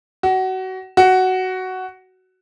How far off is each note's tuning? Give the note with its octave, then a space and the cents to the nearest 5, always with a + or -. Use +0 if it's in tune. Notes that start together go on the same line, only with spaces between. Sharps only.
F#4 +25
F#4 +10